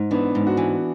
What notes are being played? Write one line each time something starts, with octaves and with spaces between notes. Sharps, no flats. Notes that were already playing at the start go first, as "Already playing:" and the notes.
Already playing: G#2
E3 B3 D4
G#2
D4 F#4
E3